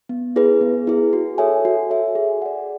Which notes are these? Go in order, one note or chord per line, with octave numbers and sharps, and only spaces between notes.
B3
E4 G#4 B4
B3
E4 G#4 B4
F#4
A4 C#5 E5 G#5
F#4
A4 C#5 E5 G#5
G#4
D5 F#5